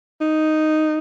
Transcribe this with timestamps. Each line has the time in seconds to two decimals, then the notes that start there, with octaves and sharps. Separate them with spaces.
0.21 D#4